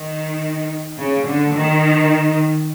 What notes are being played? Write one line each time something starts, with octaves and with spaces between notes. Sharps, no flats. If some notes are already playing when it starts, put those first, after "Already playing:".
Already playing: D#3
C#3
D3
D#3